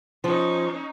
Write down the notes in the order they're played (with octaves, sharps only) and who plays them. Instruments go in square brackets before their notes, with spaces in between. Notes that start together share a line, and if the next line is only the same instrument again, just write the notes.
[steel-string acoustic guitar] F3 [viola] C#4 D#4